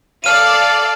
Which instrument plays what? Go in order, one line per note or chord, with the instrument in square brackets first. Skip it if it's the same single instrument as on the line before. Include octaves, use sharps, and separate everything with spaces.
[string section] A4 D5 F5 [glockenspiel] F6 D#7